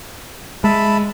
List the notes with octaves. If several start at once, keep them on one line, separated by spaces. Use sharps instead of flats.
G#3 E5 A5 B5